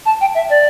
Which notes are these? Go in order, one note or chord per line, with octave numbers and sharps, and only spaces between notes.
A5
G5
E5
D5